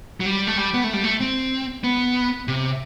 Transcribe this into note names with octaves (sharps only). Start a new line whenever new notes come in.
F#3
G3
A3
G3
B3
A3
G3
A3
C4
B3
C3